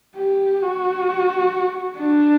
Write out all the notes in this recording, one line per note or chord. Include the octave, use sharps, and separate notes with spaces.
G4
F#4
D4